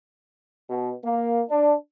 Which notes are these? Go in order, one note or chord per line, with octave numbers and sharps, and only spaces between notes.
B2
A#3
D4